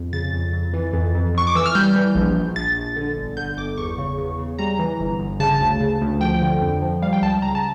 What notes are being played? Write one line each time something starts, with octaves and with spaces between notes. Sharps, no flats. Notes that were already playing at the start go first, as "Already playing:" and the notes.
Already playing: F2
C#3 A6
F2
F2
E3
F2
F2
F2 C#6
D6
E3 E6
F6
G3 G6
E3
A#1
A#1
A#1 A6
A#1
D3
G1
D3 G6
G1 D6
E2 C#6
C#3
E2
C#3
G3 A#5
E3
G1
G1
C#3 A5
D2
C#3
D2
F3 G5
D3
F2
F3
G3 F5
G5
C#2 A5
C#3 A#5
A5